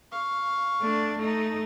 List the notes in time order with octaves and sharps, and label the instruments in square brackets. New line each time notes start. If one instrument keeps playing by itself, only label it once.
[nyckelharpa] F5 C#6
[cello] A3 D4
A3 D#4